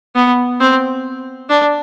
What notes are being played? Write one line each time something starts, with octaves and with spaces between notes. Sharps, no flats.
B3
C4
D4